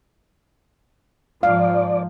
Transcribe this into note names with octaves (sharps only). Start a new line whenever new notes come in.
G#2 F3 D5 F5